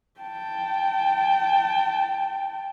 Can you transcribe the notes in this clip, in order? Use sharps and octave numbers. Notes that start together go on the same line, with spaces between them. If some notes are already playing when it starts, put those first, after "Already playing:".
G5 A5